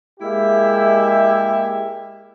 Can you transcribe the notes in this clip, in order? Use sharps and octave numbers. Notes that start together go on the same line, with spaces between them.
G#3 A#3 E4 G4 E5